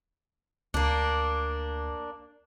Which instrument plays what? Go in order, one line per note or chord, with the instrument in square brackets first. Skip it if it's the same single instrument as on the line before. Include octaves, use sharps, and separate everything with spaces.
[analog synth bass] D2 [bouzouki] A#3 D4